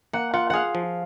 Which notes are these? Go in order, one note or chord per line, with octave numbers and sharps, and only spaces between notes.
A#3 F#5
F4 F#5
G#4 F5 F#5
F3